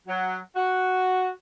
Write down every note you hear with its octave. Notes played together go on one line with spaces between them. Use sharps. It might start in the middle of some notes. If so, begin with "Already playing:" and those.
F#3
F#4